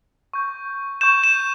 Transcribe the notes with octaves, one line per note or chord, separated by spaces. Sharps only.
C#6 G6
C#6 G6 E7
E7